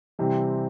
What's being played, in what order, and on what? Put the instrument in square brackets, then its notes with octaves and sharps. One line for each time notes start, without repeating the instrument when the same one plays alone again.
[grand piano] C3 E3 G3 C4